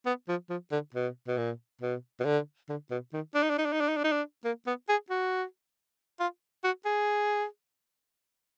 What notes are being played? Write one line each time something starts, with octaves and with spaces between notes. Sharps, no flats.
B3
F3
F3
D3
B2
B2
A#2
B2
B2
D3
D3
B2
D#3
D4
D#4
D4
D#4
D4
D#4
D4
D#4
D4
D#4
D4
A#3
B3
G#4
F#4
F4
F#4
G#4